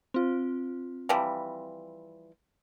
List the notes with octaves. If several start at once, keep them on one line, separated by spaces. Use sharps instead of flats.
C4 F4
E3 F3 G3